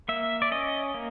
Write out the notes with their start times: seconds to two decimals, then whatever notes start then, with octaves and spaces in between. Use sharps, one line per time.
0.08 A#3 E5
0.42 D5
0.51 C#4 D#5
0.94 A#3